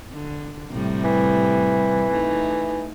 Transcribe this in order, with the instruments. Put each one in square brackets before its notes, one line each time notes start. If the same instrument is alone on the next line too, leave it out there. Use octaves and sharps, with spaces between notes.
[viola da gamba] D3
A2 C3 G3
[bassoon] E3
[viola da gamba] A3 D#4